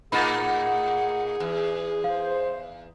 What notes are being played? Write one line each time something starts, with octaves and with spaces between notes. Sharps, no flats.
A2 A#3 D#4 G#4 F#5 B5 A6
E2
C5 F5